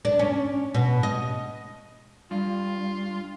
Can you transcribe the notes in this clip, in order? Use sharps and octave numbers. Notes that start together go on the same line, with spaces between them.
D4
C#4
B2
D#5
G2 F4